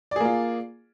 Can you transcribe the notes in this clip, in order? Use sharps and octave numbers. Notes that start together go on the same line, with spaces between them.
A#3 F4 G#4 D5